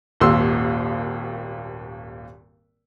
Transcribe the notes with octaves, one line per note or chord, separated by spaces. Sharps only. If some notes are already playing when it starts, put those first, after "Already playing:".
D#1 G#1 D#2 C6 E6